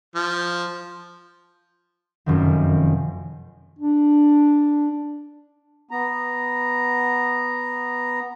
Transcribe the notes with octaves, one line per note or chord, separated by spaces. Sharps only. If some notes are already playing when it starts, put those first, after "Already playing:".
F3
F1 F#2 D#3
D4
B3 A#5